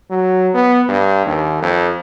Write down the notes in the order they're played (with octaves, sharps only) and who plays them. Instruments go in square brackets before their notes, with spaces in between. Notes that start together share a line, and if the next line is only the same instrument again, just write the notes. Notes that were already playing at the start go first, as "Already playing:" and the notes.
[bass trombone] F#3
B3
G2
D#2
F2